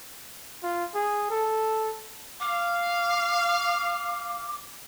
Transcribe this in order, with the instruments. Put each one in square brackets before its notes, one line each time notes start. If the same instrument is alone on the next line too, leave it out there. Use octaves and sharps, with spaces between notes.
[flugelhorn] F4
G#4
A4
[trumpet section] F5 [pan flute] D6